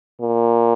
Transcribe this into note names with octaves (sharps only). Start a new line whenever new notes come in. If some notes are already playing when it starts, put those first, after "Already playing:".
A#2